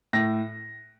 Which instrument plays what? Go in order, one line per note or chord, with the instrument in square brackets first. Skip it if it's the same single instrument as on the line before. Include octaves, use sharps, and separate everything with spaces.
[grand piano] A2 A#6